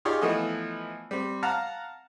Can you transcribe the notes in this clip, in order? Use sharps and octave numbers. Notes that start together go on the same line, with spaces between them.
D#4 F4 G4 G#4 C#5 D5
E3 F3 A3 B3 D#5
G3 C4
F5 F#5 A5 A#5